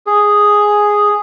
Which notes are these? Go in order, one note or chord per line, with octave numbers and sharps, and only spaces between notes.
G#4